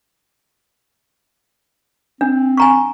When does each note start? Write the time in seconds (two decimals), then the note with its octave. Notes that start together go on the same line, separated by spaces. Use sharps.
2.21 C4 D4
2.57 G#5 A#5 C#6